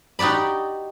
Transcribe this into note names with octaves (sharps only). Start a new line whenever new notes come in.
D#4 F#4 G4 D5 B5